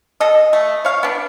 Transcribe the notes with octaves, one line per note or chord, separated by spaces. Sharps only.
A4 D#5
A3
C#5 F5
B3 D4